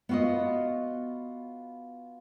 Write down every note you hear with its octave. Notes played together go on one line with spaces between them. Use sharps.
B3 F4 F#4 B4 D#5